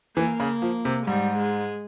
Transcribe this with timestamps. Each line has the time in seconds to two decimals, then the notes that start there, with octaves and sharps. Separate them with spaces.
0.17 E3 A#3
0.40 C#3
0.62 F3
0.85 C3
1.07 G#2 G3
1.37 G#3